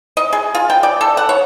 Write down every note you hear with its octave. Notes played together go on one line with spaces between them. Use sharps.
D#5
G#4
F4
G5
D5
A4
F#5
C#5